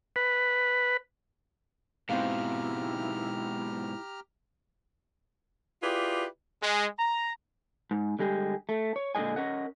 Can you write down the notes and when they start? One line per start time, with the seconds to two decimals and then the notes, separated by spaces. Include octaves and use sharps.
0.16 B4
2.09 G#2 B2 C4 E4 G4 F5 A#5 F6
5.83 E4 F4 G4 G#4 B4 D5
6.63 G#3
6.99 A#5
7.91 G#2
8.19 D3 G3 G#3 E4 G4 G#4
8.69 A3
8.96 C#5
9.15 A#2 D3 F3 G#3 D#5 G#5
9.36 C#4 A#4 D#5 F#5